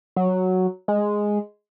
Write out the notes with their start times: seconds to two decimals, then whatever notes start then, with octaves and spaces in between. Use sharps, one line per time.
0.16 F#3
0.88 G#3